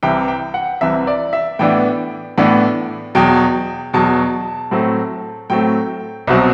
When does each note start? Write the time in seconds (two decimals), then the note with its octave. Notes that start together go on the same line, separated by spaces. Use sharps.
0.03 C2 C3 E3 G5
0.28 G5
0.54 F#5
0.81 C2 C3 E3 E5
1.07 D5
1.33 E5
1.59 A2 E3 B3 D4 G5
2.38 A2 E3 B3 D4
3.15 E2 B2 F#3 G5
3.93 E2 B2 F#3 A5
4.71 A2 F#3 A3 C4
5.50 A2 F#3 A3 C4 G5
6.27 C2 B2 F#3 C4